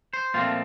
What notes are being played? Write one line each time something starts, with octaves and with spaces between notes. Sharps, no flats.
C5
A#2 F3 A3 C4 F4